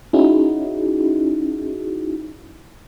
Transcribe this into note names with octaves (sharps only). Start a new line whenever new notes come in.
C#4 D#4 E4 F#4 G#4